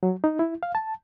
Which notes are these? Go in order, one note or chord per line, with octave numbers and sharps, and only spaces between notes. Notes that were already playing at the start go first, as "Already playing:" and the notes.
F#3
D#4
E4
F5
A5